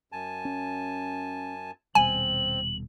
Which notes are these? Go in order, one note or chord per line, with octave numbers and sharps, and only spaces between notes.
F#2 G#5 A5
C#4
D#1 B2 G3 C4 G#5 F#7